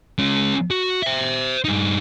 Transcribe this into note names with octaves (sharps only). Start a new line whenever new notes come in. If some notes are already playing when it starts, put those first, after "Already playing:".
G#3 C#4
F#4
C5 E5
G2 D#4